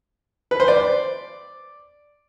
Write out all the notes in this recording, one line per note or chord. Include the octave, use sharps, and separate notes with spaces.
B4
C5
D5